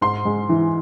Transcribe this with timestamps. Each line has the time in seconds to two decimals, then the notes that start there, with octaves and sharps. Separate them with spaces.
0.01 G#2 C6
0.25 G#3
0.49 E3